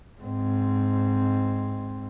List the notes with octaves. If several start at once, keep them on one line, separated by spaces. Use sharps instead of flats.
G#2 C4